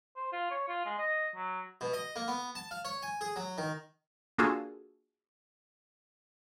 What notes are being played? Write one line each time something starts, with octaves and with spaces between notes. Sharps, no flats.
C5
F4
C#5
F4
G#3
D#5
F#3
B2
D#5
A#3
B3
A5
F5
C#5
G#5
G#4
F#3
D#3
A#3 D4 F4 F#4 G#4 A4